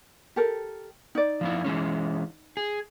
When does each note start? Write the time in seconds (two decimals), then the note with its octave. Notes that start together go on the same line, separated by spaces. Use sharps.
0.36 G4 A4 A#4
1.15 D#4 D5
1.41 F3 B3 E4
1.64 E3 G#3 C#4
2.57 G#4